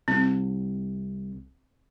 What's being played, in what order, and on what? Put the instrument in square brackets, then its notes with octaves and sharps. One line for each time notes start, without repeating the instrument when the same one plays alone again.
[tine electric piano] C2 [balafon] C4